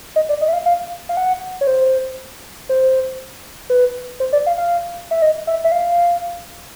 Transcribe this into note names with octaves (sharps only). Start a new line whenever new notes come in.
D#5
D5
D#5
E5
F5
F5
F5
F#5
C#5
C5
C5
B4
C5
D5
F5
F5
E5
D#5
E5
E5
F5